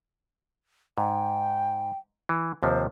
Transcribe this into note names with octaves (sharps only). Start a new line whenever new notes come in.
G#2 G5
E3
D#2 C3 F3 C5